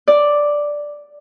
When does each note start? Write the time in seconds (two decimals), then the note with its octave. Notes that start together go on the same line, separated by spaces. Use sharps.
0.08 D5